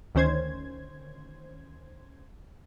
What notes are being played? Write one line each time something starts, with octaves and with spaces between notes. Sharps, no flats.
D2 D#3 C#4 C5 G#6